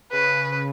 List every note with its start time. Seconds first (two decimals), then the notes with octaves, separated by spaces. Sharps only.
0.12 C#3 B4